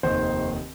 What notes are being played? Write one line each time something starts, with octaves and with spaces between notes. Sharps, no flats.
F1 D#2 D#3 C5